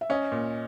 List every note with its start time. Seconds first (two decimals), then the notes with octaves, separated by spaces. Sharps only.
0.01 E5
0.09 C#4 C#5 D#5
0.32 A#2